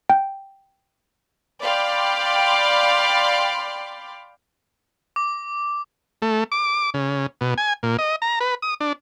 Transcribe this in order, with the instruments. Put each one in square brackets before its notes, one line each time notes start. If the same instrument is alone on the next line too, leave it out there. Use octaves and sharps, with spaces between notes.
[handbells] G5
[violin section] D5 F5 G5 B5 C6 D6
[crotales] D6
[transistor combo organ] A3
D6
C#3
B2
G#5
A#2
D#5
A#5
B4
D#6
D4